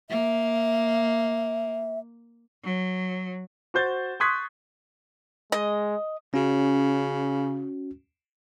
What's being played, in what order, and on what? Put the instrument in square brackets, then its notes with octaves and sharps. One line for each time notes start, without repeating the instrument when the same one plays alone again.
[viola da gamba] A#3 [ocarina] E5
[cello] F#3
[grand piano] F#4 C5 G6 A6
C6 C#6 D#6 F#6 G#6 B6
[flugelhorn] G#3 [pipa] D#5
[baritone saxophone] C#3 [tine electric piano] C#4 F#4